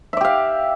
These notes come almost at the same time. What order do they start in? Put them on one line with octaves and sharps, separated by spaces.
E5 D5 G4 F5